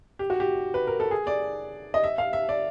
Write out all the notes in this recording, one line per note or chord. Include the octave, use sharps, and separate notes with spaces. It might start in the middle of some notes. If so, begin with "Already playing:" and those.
G4
F#4
G4
B4
A#4
A4
G#4
D5
D#5
E5
F5
E5
D5